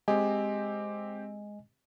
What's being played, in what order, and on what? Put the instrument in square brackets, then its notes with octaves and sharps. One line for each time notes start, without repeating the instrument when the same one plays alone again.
[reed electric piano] G#3 D#5 G#5 [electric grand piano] C4 G4